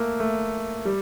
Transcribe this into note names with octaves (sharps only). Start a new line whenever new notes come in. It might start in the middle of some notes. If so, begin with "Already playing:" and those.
Already playing: A3 A#3
A3
G3